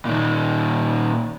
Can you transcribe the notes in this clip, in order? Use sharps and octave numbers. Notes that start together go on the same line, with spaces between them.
A#2 D#3